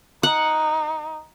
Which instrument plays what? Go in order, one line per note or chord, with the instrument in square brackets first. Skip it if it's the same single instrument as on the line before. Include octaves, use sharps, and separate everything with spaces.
[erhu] D#4 [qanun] F#5